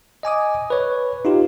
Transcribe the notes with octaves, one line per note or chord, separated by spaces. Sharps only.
D#5 G#5 D6 D#6
B4 C#5
D#4 F4 G4